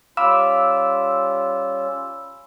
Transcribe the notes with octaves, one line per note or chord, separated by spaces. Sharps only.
G3 C#4 F4 F5 B5 D6 E6